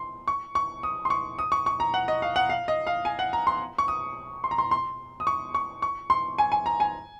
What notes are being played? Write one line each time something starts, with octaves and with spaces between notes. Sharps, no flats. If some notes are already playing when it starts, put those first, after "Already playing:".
Already playing: C6
C#6
C#6
D#6
C6
C#6
D#6
C#6
C#6
A#5
F#5
D#5
F5
F#5
F5
D#5
F5
G#5
F#5
A#5
C6
C#6
D#6
C6
A#5
C6
C6
D#6
C#6
C#6
C#6
C6
G#5
G#5
A#5
G#5